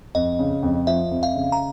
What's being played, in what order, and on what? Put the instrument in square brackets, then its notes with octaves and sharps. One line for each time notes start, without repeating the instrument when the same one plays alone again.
[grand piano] F2 [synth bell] D#5
[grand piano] C#3
F2
[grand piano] F3 [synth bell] E5
[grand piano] F2
[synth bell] F5
[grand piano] C#3
[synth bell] A#5